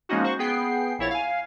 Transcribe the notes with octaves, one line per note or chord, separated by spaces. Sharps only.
F3 G#3 A#3 C#4 D#4 F#4
F#4 C5 C#6
B3 G#4 G5 C7
A#1 E4 C#5 A6
F5 G#5